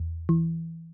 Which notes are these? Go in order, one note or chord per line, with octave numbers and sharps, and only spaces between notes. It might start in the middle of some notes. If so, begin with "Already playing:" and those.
Already playing: E2
E3